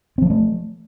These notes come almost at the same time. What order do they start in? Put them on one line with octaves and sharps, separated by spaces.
C4 F3 A#3 A3